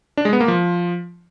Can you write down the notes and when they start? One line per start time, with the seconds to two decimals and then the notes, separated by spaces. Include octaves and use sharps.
0.17 D4
0.25 G#3
0.33 B3
0.40 A#3
0.48 F3